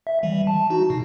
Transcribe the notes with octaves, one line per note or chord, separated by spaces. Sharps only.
E5
E3 G3
A5
D#4 F#4
B2